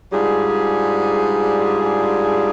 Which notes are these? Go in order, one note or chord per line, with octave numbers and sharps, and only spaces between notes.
G#2 G3 D4 F4 G#4